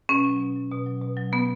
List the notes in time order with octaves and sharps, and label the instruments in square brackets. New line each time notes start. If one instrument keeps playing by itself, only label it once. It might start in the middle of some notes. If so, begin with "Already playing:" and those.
[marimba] B2 C#4
F#3
B2
F#3
B2
F#3
B2
F#3
B2 B3